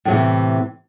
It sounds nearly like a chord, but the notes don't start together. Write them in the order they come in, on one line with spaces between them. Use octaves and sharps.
A2 F#3 C3 E3